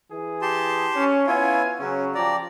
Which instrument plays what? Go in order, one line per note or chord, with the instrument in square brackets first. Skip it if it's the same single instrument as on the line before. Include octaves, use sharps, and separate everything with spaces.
[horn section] E3 G#4
[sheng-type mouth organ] G4 A5 C6
[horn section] C#4
[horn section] B3 F5 G#5 [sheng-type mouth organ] E4 F4 C#5
[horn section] C#3 F#3 C#5 [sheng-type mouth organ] C#4
[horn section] F3 G4 A#5 [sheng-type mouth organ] D5